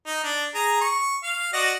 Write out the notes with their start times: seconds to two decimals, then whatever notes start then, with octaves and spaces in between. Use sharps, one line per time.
0.07 D#4
0.24 D4
0.55 G#4 A#5
0.81 C#6
1.23 F5
1.53 F#4 D5 D#5